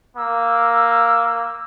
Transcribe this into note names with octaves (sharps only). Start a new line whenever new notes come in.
A#3 E6